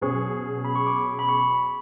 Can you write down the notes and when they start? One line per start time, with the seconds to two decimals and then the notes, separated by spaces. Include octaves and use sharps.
0.01 B2 F#3 C#4 G#4 C#6
0.65 B5
0.75 C#6
0.87 D6
1.19 B5
1.29 C#6